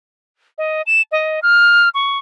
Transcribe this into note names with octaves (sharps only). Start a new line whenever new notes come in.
D#5
E7
D#5
F6
C#6